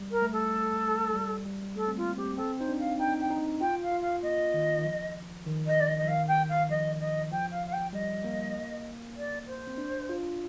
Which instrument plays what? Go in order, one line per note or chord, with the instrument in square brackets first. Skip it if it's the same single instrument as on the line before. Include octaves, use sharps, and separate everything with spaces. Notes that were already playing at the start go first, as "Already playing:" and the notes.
Already playing: [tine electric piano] G3
[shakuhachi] A#4
[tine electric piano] A3
[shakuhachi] A4
[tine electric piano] G3
G3
[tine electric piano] A3 [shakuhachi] A4
[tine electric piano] C4
[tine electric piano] A#3 [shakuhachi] F4
[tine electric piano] C4 [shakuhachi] G4
[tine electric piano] C4 [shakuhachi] A4
[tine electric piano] D#4 [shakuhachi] C5
[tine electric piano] D4
[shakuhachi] F5
[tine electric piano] D#4 [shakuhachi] G5
[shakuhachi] G5
[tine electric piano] D#4
[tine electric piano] F4 [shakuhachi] G5
[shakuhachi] F5
[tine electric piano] F4
[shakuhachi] F5
[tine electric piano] A#3 [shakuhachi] D#5
[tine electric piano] D#3
D#3
F3
D#3
[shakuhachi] D#5
D5
D#5
D#5
[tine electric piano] F3
[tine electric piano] D#3 [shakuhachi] F5
[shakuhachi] G5
F5
[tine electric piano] F3 [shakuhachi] D#5
[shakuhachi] D#5
[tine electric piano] F3 [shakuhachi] G5
[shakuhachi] F5
F5
G5
[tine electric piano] G3 [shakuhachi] D#5
[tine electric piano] A#3
[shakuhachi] D5
C5
[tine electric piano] C4
D4
F4